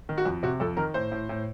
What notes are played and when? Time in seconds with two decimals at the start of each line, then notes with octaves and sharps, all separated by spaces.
0.09 D#3
0.18 F#4
0.25 F2
0.43 C3 F#4
0.60 F2 A4
0.77 D#3 A#4
0.94 A2 C5
1.12 A2
1.29 A2